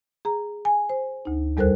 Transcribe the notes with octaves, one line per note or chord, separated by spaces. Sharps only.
G#4 A#5
G#5
C5
D2 D#4
E2 G3 A4 A#4 C5 F#6